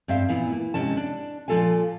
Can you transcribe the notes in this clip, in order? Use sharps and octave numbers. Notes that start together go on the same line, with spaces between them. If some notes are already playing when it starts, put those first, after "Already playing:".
G2 C4 E5 F5
A#2 E3 B3 E4
A#3
G#2 C3 C#4 A5
D4
A#2 F3 F4 A4 F5 G#5